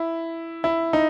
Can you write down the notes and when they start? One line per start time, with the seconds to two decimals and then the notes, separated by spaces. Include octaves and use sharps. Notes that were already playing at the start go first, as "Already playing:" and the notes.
Already playing: E4
0.64 E4
0.93 D#4